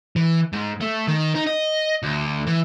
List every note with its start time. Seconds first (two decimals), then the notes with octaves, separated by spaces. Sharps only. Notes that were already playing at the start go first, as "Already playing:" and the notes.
0.16 E3
0.53 G#2
0.81 A3
1.08 D#3
1.35 D#4
1.47 D#5
2.03 D2
2.47 E3